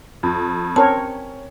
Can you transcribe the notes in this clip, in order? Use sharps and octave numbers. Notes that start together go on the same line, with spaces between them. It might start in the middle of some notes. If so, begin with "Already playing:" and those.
F2
C4 C#4 A#4 C#5 A5